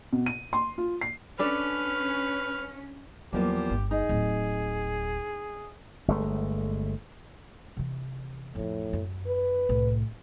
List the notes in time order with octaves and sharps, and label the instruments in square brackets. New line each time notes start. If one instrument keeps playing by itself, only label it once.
[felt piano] B2
D#7
C6
F4
C7
[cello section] C#4 [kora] D4 A4 D5 [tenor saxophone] B4 [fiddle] F6
[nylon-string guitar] E2 F3 A#3 [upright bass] F#3 [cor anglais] G4
[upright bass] G1
[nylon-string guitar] D#4 [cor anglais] G#4
[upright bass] D1
[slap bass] G1 G#3 A3
[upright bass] C3 E3
[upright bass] F2 F3 [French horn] A2
[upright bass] F#2
[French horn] B4
[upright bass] C2 A2